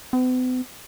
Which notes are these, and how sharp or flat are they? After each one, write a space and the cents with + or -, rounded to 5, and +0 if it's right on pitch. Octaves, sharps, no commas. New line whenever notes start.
B3 +45